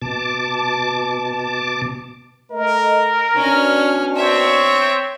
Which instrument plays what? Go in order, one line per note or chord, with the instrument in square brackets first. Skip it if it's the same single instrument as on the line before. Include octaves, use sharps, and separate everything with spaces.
[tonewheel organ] B2 A5 D6
[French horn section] A3 D#5 [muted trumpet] A#4
[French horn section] B2 D4 [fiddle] C#4 F6
[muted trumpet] C4 [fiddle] C#5 E5